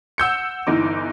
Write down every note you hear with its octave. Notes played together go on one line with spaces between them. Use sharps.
F#5 E6 G6 C#7
G1 E3 D#4 D6